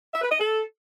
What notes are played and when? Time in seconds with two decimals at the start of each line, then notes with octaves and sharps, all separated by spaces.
0.13 E5
0.22 B4
0.30 D#5
0.39 A4